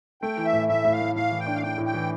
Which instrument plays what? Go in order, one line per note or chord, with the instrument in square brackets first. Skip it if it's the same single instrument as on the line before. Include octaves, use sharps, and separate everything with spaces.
[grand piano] A3 [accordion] G5
[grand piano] E3
[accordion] E5
[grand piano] A2
[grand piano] A2 [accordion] E5
[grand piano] A2
[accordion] F5
[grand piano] A3
[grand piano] A2 [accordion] F5
[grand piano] E3
[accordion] G5
[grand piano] D4
[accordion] F5
[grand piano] D4 [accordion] G5
[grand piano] A2
[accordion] G5
[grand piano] E3